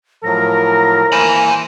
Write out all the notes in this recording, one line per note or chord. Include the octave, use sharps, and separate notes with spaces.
A2 F3 F#3 A#4 A#6
E3 A#3 C5 G#5 B5